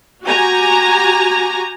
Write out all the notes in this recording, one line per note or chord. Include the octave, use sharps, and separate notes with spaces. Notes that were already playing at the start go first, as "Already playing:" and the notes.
F#4 G4 G#5 A#5